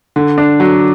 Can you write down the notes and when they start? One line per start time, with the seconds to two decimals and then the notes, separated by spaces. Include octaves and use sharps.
0.16 D3
0.38 D4
0.60 F#3